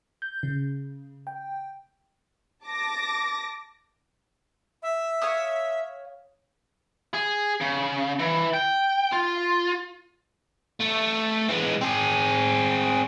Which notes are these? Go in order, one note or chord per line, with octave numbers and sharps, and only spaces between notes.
G6
C#3
G5
A5 D6 A#6
E5
C#5 F5 D#6
G#4
C#3
E3
G5
F4
A3
E3 G#3
C4 G#4